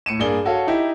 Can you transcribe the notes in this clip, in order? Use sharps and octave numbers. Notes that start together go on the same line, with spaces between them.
A2 C#7 D#7 E7
G2 A#3 G#4 D5 G7
F#4 A4 C#5 F5
D#4 E4 G4